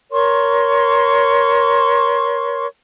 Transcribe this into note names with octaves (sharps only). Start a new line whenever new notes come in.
A#4 C#5 C6 C#6